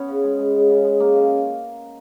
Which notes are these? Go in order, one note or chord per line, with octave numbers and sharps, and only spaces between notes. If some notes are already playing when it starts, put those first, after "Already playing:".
Already playing: B3 C#4
C#3
G#3
G#3
C#3
C#3
G#3
G#3 A#3
C#3